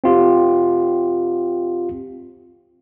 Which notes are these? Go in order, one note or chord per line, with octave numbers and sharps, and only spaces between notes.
C4 F4 G4